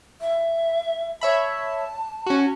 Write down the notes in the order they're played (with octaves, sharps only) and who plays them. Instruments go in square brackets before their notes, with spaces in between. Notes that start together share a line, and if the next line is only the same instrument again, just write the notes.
[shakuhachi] E5
[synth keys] C#5 E5 B5 [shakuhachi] A5
[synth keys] C#4 F#4